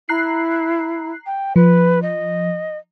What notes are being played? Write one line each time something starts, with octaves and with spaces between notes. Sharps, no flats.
E4 A#5 F#6 C7
G5
F3 B4
D#5